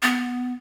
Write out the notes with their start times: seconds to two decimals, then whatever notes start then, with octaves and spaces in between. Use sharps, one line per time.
0.02 B3